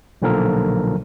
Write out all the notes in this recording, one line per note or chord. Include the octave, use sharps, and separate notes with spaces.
B1 A#2 D3 F3 A4 A#4